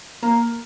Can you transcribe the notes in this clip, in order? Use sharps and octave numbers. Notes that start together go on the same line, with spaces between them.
A#3 A#5